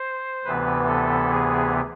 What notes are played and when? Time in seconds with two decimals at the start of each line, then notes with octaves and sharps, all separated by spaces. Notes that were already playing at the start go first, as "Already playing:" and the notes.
Already playing: C5
0.44 D2 C3 E3 B3 B4
0.87 A4
1.29 G#4